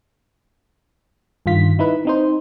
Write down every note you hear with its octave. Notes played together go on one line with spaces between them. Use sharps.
G2 D#3 F4 B6
D#4 E4 B4
C4 D#4 C5